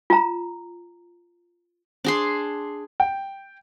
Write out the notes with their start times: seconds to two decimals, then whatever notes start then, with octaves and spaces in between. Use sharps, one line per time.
0.10 F4 A#5
2.04 D4 G#4 C6
3.00 G5